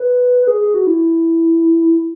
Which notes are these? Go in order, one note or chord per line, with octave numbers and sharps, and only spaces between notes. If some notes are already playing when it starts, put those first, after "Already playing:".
Already playing: B4
B4
G#4
G#4
F#4
E4